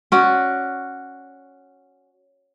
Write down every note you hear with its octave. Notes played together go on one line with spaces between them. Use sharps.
C#4 F#4 D5